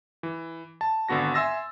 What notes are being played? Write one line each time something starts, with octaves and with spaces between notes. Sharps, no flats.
E3
A5
G#1 D3 B3 F#4 A#6
E5 G#5 C6 E6 A6 A#6